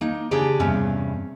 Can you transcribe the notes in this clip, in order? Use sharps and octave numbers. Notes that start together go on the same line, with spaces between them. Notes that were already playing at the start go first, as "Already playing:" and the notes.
A#3 D#4
C#3 D4 G4 G#4 A#5
E2 G2 C3 C#4